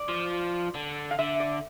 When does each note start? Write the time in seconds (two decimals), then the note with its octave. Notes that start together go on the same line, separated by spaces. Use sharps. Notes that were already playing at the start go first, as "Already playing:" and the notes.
Already playing: D5
0.08 F3
0.75 D3
1.11 F5
1.19 D3 E5
1.40 D5